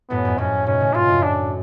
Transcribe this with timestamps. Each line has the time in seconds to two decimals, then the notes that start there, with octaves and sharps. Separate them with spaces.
0.10 F#2 A2 B3
0.24 F2 G#2
0.38 F#2 A2 C#4
0.66 G#2 B2 C#4
0.80 A2 C#3
0.94 G#2 B2 F4
1.09 F#2 A2
1.23 D4